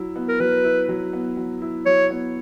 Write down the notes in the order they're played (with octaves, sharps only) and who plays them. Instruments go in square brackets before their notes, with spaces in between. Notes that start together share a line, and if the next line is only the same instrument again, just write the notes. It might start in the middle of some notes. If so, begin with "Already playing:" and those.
Already playing: [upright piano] F#3 E4
B3
[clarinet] A#4
[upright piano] F#3 [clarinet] B4
[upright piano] E4
F#3
B3
F#3
E4
[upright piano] F#3 [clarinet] C#5
[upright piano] B3